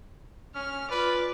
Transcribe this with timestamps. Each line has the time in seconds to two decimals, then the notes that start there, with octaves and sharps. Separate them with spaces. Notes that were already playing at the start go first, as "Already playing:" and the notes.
0.56 C#4 F6
0.91 F4 B4 D5